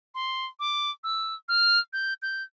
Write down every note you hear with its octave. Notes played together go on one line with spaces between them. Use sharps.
C6
D6
E6
F6
G6
G6